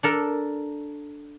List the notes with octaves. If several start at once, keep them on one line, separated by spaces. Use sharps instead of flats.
D4 A4 A#4